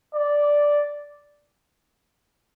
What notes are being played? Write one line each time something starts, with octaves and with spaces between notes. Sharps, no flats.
D5